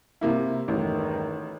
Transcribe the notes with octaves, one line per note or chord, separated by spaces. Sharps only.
C3 A#3 E4
A1 E2 G2 D#3